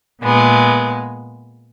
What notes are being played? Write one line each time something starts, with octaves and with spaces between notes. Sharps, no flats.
A#2 G#3 B3